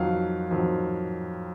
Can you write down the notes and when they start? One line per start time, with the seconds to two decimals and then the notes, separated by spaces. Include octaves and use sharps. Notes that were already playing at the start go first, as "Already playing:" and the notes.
Already playing: F2 D#3 F#3 F5
0.51 F2 D#3 F#3